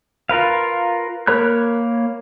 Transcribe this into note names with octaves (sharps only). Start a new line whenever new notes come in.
F4 A#4 B4 F5
A#3 A#4 C#5 B5 F#6